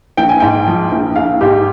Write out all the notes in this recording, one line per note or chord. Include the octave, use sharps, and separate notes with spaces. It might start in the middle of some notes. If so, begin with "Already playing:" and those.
A#1 G5
G#5
G#2 G5
F3
A#1
A#1 F5
G#2 G4